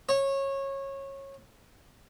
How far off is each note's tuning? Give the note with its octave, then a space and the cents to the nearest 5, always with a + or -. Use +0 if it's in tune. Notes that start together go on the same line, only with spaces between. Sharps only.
C#5 -20